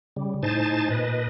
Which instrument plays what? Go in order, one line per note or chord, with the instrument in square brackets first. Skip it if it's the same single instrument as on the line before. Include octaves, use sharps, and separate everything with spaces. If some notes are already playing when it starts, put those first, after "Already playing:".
[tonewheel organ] C#3 G3
A2 D#4 C5 G#5 A5 A6
A#2 B4 D#5